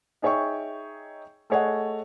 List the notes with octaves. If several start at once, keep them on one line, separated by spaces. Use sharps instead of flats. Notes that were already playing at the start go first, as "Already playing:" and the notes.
D#4 G#4 C#5 E5 G5 C#6
A3 G#4 C#5 D#5 F#5